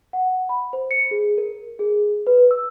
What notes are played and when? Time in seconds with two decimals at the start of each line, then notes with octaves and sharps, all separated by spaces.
0.13 F#5
0.49 B5
0.73 C5
0.91 C#7
1.11 G#4
1.38 A#4
1.79 G#4
2.27 B4
2.51 E6